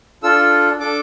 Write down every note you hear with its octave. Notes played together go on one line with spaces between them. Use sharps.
D4 F4 A4 E6
D4 A4 D6